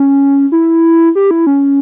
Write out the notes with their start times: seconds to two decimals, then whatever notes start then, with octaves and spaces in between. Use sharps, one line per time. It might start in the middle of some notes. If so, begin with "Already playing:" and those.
Already playing: C#4
0.52 E4
1.15 G4
1.31 E4
1.47 C#4